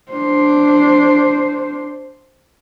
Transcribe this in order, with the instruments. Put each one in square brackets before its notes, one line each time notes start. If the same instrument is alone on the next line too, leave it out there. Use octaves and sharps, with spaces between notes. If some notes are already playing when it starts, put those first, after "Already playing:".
[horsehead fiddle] D4 C5